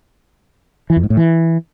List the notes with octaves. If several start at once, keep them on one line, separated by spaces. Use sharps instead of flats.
E3
F2
G#2
A2
E3